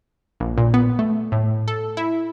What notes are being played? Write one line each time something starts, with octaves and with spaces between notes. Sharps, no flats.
A#1
A#2
B3
A3
A2
A4
E4